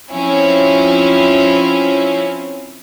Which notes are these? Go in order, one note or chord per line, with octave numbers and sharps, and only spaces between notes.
F3 C4 C#4 E4